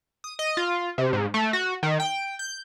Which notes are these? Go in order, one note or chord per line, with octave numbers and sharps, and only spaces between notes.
D#6
D#5
F4
C3
G#2
A3
F#4
D#3
G5
G6